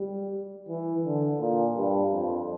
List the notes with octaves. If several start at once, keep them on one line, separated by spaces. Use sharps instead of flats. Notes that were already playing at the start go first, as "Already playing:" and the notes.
Already playing: G3
E3
D3
A#2
G2
F2